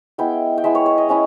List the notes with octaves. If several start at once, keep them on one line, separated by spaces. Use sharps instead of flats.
G#3 B3 E4 G5
G5
G#3 B3 E4 E5
C#5
C#5
D#5
G#3 C#4 E4